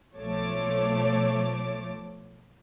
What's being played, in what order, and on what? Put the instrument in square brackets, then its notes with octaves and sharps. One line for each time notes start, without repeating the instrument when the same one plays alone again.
[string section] B1 F3 A3 C#5 A5 D6